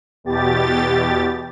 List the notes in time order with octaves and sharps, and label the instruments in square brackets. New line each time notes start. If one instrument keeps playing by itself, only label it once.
[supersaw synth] E2 B2 G4 A6